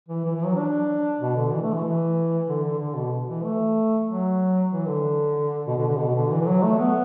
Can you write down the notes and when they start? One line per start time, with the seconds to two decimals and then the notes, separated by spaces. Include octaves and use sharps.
0.08 E3
0.25 E3
0.35 E3
0.45 F#3
0.56 D4
1.20 B2
1.36 D3
1.52 E3
1.62 A3
1.73 E3
1.84 E3
2.48 D3
2.64 D3
2.80 D3
2.96 B2
3.28 E3
3.44 A3
4.08 F#3
4.71 E3
4.87 D3
5.67 B2
5.78 D3
5.88 D3
5.99 B2
6.15 D3
6.31 E3
6.41 E3
6.47 F#3
6.63 A3
6.79 B3